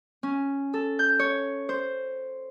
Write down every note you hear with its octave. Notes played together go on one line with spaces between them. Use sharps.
C#4
A4
G6
C#5
C5